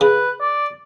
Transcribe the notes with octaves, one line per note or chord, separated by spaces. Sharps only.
C#3 B4
D5